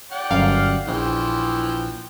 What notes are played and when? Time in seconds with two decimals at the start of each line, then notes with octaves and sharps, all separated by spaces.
0.12 D5 F#5 G5
0.31 G1 F#2 F5
0.87 A#1 E3 F3 G5